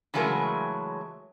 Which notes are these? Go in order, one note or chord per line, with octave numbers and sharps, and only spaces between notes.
C#3 E3 F#3 G#3 A3 A#4